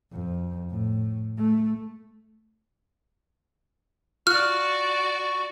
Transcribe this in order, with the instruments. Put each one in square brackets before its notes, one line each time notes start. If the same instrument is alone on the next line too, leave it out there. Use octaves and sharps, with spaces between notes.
[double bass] F2
A2
A3
[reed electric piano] F4 F#6 [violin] F#4 D5 [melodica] C#6 [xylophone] F6